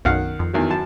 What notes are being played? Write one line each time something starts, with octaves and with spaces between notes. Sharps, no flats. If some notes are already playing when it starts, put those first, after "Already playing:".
B1 F#2 D#3 F5 F#5
F2
E2 D#3 F#3
F#2 A5